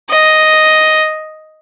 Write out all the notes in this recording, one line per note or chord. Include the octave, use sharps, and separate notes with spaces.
D#5